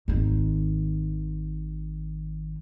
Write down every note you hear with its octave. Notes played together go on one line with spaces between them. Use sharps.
G#1 D#3